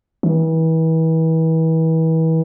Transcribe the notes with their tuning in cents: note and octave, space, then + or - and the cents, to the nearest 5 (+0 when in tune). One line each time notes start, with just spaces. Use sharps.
E3 -35